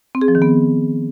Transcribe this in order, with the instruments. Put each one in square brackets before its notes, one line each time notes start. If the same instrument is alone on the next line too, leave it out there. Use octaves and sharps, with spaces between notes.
[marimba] C4
G#4
F3
D#3
B3